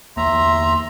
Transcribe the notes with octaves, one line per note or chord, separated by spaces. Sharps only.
E2 A#3 E5 A#5 C6